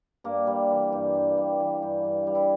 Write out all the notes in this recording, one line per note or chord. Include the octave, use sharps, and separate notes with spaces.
G2 A#3
G3
E3
G2
G2
G3
E3
G2
G2
G3
E4